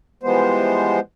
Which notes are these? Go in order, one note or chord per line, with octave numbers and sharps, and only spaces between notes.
E3 F3 G3 G#3 B3 C5